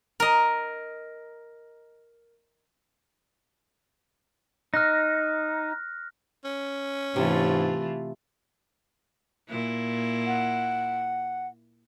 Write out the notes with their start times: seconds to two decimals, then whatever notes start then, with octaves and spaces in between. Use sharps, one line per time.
0.20 A#4 D#5
4.74 D#4 F6 F#6 A#6
6.44 C#4
7.16 G#2 C3 E3 A3 F4
9.49 A#2 E4
10.26 F#5